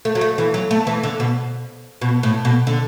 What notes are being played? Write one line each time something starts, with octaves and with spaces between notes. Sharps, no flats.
A3
F#3
A3
E3
F#3
A3
E3
D3
B2
B2
A2
B2
D3